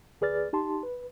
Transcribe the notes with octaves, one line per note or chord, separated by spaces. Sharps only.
D2 G#4 B4 D5 F6 A6
D#4 G4 A5 C6
B4